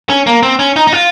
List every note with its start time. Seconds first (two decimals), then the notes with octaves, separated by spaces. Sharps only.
0.10 C#4
0.27 A#3
0.43 C4
0.59 C#4
0.76 D#4
0.87 D#4
0.93 F4